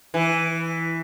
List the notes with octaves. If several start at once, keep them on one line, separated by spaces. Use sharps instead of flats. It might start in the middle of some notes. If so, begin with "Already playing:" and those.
E3